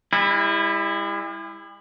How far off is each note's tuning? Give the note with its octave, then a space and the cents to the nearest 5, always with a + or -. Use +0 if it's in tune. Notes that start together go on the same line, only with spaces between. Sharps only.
G3 +45 E4 +0